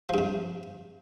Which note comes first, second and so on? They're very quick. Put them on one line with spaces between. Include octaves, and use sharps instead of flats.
F3 G2 C3